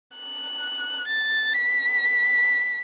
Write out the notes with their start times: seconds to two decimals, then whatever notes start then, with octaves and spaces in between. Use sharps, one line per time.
0.15 F#6
1.08 A6
1.53 B6